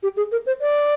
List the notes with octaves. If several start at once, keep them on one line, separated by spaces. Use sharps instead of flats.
G4
G#4
A#4
C5
D5